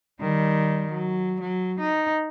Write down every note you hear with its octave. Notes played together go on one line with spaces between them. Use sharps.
D#3 G3
F#3
F#3
D#4